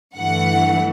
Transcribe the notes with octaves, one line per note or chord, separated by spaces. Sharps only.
G1 G2 E3 A3 F#5